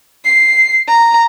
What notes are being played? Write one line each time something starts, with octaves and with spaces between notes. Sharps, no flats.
C7
A#5